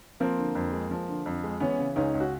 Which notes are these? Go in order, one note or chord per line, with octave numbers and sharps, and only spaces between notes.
F3 A#3 C4
D3
F2
G#3
F3
D3
F2
G#3
E3 B3 C#4
C#3
C#2 C#4 D#4
C#2
F#4